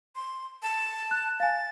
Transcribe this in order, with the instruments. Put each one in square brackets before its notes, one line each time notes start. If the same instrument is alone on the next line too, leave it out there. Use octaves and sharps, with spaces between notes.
[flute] C6
A5
[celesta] F#6
[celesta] F5 G#5 [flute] A6